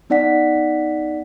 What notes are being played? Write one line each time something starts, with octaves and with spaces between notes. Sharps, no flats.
B3 D#4 D5 F#5 B6